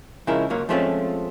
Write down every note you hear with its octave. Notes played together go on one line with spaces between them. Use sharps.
C#3 F3 G#3 C#4 E4 A#4
C#2 F#3 A#3 C#5
F3 G#3 A3 C4 C#4 F4